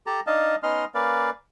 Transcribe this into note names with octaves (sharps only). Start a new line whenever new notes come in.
G4 A4 A5 A#5
D4 D#4 D#5 F5 A5
B3 C#4 D#4 D#5 C6 F6
A#3 C#4 B4 D5 F5